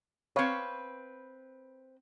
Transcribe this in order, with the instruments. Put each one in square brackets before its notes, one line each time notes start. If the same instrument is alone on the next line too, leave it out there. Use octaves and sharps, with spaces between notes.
[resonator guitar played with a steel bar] C4 B4 [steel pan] C#5 F5